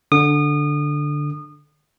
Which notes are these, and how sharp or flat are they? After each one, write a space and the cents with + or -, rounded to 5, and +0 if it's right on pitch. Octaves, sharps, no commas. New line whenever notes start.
D3 +0 D#6 -30